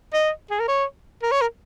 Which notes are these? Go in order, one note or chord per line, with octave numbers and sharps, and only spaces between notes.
D#5
G#4
A#4
C#5
A#4
C#5
A#4